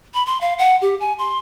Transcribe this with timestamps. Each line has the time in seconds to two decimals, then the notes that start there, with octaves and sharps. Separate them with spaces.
0.14 B5
0.26 C6
0.41 F5
0.58 F#5
0.81 G4
1.00 G#5
1.19 C6